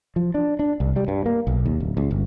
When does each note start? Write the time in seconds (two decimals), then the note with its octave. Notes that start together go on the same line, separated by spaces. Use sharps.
0.16 F3
0.34 D4
0.59 D4
0.80 C2
0.96 G3
1.08 G2
1.26 A#3
1.47 B1
1.66 D#2
1.80 D1
1.97 C#2
2.11 G1